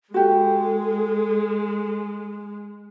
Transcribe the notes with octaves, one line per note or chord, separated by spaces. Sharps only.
G#3 F#4 G4 A4